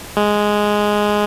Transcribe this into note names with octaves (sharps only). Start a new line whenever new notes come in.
G#3